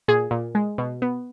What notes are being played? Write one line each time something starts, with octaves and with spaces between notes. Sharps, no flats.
A#2 G#4
A#2
G#3
B2
B3